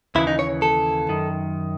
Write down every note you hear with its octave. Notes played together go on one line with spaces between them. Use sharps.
D#2 C#3 E3 E4
D#4
C#5
A4
F#2 D#3